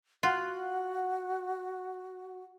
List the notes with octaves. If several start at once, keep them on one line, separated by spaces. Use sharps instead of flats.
F4 F#4 F#5